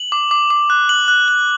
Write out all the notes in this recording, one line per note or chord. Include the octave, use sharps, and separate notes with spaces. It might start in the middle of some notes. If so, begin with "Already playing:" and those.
Already playing: F#7
D6
D6
D6
F#6
F#6 F#7
F#6
F#6